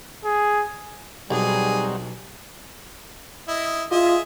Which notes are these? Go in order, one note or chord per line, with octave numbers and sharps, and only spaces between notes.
G#4
B1 G3 C4 D#4 F#4 G#4
E4 D#5
F4 G#4 D#5 E5